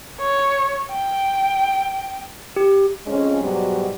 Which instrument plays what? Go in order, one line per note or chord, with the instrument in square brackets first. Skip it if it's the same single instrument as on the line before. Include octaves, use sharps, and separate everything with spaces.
[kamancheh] C#5
G5
[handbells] G4
[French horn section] F2 G#3 C#4
G#2 B2 F#3 G3